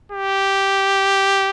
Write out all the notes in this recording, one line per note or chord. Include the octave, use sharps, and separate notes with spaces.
G4